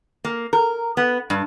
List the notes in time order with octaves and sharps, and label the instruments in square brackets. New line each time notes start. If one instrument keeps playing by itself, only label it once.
[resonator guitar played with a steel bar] A#3
A#4
B3
G2